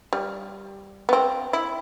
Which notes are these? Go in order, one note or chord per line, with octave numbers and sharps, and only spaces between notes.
G3
B3
C4
E4